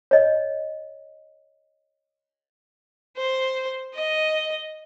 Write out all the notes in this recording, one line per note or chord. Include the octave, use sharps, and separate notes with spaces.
C#5 D#5
C5
D#5